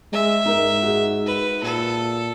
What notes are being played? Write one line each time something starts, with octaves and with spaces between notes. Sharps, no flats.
G#3 E5
G#2 D#4 A#4
F#4 G#4
B4
A#2 A4